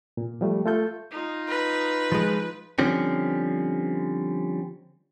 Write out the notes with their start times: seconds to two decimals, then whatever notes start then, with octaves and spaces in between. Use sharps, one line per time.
0.17 A#2
0.41 F3 G3 A3
0.66 A3 F4 A4 G6
1.11 D#4 F4
1.48 B4
2.12 F3 G#3
2.79 D3 F3 G3 C4 C#4